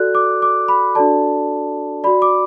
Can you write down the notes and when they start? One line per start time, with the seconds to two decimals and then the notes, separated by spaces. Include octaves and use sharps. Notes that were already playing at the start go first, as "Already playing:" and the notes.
Already playing: F#4 A4 D5 F#6
0.15 D6
0.42 D6
0.68 B5
0.95 D4 F#4 A4 D5 A5
2.04 F#4 D5 B5
2.22 D6